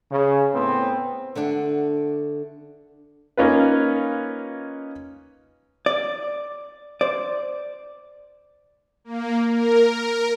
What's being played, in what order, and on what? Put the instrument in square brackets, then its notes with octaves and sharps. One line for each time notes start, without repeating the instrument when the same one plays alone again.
[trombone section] C#3
A2 B3 C4
[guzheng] D3 A3 D4 F#5
[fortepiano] A#3 C#4 D#4 F4 B4
[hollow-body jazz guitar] D5
C5 D5
[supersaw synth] A#3
A#4